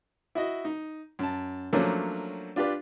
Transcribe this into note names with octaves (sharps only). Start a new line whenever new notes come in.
E4 F#4 D#5
D#4
F#2 A5
F3 F#3 A3 A#3 C#4 D4
D4 F4 G4 B4 D5